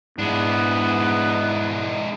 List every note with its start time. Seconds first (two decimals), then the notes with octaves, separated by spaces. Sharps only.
0.18 G#2 G#3 B3 D4 E4